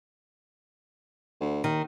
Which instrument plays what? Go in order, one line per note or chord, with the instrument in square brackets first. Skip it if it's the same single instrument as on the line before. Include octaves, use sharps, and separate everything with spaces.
[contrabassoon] D2
[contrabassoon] D#2 [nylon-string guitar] D#3